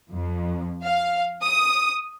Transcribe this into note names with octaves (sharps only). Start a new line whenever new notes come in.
F2
F5
D#6